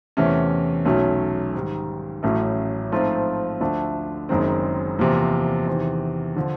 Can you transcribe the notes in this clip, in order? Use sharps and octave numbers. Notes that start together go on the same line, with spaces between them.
E2 C3 E3 A3 C#4
B1 B2 F#3 A3 C#4
G#2 D#3 G3
A1 A2 F#3 A3 C#4
G#2 F3 A3 C4 F4
D2 D3 F3 A3 D4
F#1 F#2 D#3 G#3 C4
E2 C3 F3 A#3
E2 C3 D#3
D3 F3